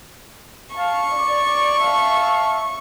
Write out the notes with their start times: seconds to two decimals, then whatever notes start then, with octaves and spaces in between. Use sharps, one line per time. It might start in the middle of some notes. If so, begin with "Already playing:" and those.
0.76 F5 A5 C#6
1.12 D5
1.80 E5 F5 A5